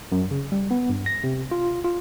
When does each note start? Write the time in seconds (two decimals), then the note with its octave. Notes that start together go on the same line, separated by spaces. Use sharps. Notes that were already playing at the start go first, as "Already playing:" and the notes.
0.12 F#2
0.31 C#3
0.52 G3
0.71 B3
0.89 G2
1.06 A#6
1.24 C3
1.51 F4
1.84 F4